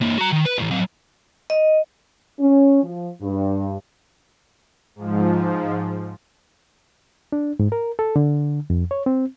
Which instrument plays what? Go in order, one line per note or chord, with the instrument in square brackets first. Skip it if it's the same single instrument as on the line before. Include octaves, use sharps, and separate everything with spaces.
[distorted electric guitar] E3 A#3
F#4 A#5
D#3
B4
A2 E3
F#3 C4
[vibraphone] D#5
[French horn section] C#4
F3
G2
[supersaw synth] G#2 F3
[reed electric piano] D4
G#2
A#4
A4
D3
F2
C#5
C4